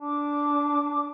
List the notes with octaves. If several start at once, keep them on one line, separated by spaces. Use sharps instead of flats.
D4 D6